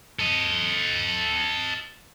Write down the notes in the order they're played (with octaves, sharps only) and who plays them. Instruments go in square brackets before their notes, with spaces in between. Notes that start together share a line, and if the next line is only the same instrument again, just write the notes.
[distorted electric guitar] A4 D#5